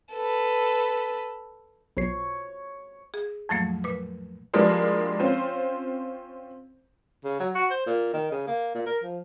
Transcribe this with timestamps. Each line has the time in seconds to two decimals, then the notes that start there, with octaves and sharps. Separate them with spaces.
0.13 A4 B4
1.97 B1 C#5 C7
3.14 G#4
3.49 F2 A2 F3 F#3 A3 A#3
3.84 A#2 B4
4.54 F3 G3 G#3 A#3 D4 E4
5.20 C4 C#4 F4 C5
7.24 C#3
7.40 F#3
7.55 F#4
7.71 C5
7.87 A#2
8.13 D#3
8.31 C#3
8.47 A#3
8.75 A#2
8.86 A#4
9.03 F3